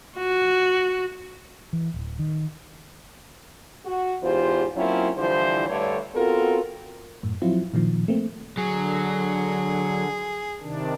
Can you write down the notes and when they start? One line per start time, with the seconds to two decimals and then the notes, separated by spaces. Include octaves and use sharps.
0.17 F#4
1.73 E3
1.94 D1
2.19 D#3
3.85 F#4
4.22 E2 G#2 F4 G4 C5
4.76 F#3 A#3 C4 C#4 E4 F4
5.16 D3 E3 F3 G3 E4 C5
5.68 G2 D3 A3 C#5
6.15 B3 C4 F4 F#4 A4 A#4
7.23 F#2 A2
7.42 F3 F#3 C4 E4 F4
7.74 A#2 D#3 F3
8.08 A3 A#3 C4
8.58 D3 F#3 G#4
10.61 C3 D#3 D4